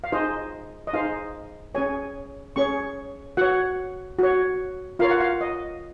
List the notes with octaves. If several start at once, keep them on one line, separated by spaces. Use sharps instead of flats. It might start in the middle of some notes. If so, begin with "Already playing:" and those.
F5
D#4 G#4 C5 D#5
D#5
D#4 G#4 C5 F5
C#4 G#4 C#5 G#5
C#4 G#4 C#5 C#6
F#4 C#5 F#5
F#4 C#5
F4 A#4 C#5 F5
F#5
F5
D#5